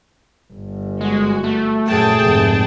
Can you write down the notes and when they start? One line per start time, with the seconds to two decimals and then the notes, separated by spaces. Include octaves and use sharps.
0.54 G1
1.01 G#3 F#4
1.44 A3
1.89 F#2 A#2 G#4 G5 A5
2.19 F1 G#2